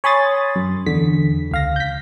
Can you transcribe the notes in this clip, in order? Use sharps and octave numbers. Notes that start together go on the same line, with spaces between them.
C#5 G#5 B5 C6 D#6 A6
F#2
E2 D3 B6
C#2 F5 A#6
G6 B6